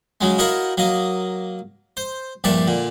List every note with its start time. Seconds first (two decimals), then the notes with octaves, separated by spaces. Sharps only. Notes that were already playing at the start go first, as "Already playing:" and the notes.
0.21 C#3 F#3 G#3
0.39 D#4 E4 F#4 A#4 C#5 F5
0.77 F#3 A#3 D#5
1.97 C5
2.44 A#1 G2 D4 D5 E5
2.67 A#2 D3